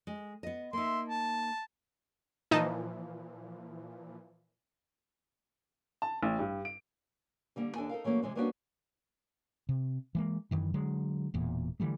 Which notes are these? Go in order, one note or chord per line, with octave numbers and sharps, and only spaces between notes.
G#3
B3 D#5
A#3 D#4 E5 C6
A5
A#2 E3 F3 D#4 D#5 A5
A5
A1
G2
D7
D3 G3 A#3
D#2 D4 A4 G#5
D#4 A4 A#4 F5
E3 F#3 A3 A#3 C#4
C3 E3 G#3 C4
G3 A#3 B3 C#4 D4 F#4
C3
E3 G#3 A#3
F#2 D#3 E3
D3 F#3 G#3
E1 E2 A#2
D3 E3 G3 A3